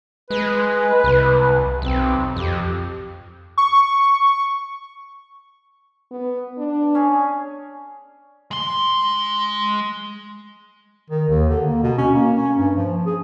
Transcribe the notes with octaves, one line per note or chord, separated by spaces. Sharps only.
G#3 B4
C2
B1 C4
F2 G4
C#6
B3
D4
C#4 G#4
G#3 C6
D#3
D#2
D3
A#3
B2
C#4
A#3
C#4
G2
F3
G#4